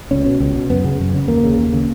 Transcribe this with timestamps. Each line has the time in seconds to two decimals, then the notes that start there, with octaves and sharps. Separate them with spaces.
0.11 C#2 C#4
0.26 B2
0.40 C#2
0.56 B2
0.70 F#2 B3
0.85 C#3
0.99 F#2
1.14 C#3
1.28 D#2 A#3
1.44 C#3
1.58 D#2
1.73 C#3